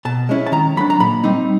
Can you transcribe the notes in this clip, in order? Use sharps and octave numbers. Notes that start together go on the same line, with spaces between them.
B2 A5
G#3 C#4 E4
A5
D#3 A#5
F#3 A3 D4 B5
A#5
A#2 B5
G3 C4 D#4